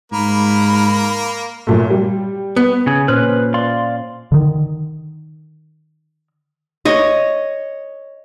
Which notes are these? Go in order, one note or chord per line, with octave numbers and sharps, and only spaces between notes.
G#2 A#3 A#4 B5
F#2 A#2 A3
G3
B3
C#3 G#4
A#2 C#4 B4 C5 F6 F#6
D5 F5 C6
D3 D#3
C#5 D#5